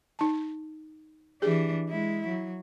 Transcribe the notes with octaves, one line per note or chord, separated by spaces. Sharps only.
D#4 A5
E3 D4 G4 G#4
G#3 E4
F#3